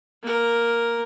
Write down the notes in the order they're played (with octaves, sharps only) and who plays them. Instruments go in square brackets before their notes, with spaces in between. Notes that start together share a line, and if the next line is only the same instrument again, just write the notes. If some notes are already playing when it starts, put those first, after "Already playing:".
[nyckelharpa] A#3 A#4